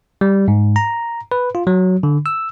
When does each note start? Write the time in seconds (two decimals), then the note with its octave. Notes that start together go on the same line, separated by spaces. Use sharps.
0.21 G3
0.48 G#2
0.76 A#5
1.32 B4
1.55 F4
1.67 F#3
2.03 D3
2.26 E6